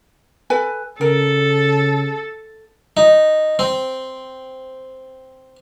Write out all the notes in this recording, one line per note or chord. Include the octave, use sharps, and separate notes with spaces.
A4 B4 G#5
C#3 A4 A#4
D#4
C4